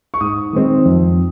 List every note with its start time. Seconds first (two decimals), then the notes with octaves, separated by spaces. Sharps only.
0.14 C#6
0.20 G#2 D#6
0.53 D#3 G#3 C4
0.85 F2